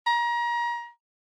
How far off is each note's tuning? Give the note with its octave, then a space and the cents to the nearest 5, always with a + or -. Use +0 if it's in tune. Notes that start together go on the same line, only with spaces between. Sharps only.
A#5 +30